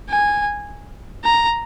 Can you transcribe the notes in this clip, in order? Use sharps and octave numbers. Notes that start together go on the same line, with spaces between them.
G#5
A#5